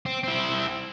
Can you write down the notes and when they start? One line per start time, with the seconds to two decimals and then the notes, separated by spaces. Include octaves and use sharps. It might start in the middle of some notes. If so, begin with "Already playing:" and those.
0.06 C4
0.23 C4 E4